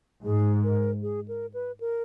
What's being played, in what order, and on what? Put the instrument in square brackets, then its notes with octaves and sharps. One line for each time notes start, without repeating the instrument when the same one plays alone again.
[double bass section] G#2 [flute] G#4
[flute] A#4
G#4
A#4
B4
A#4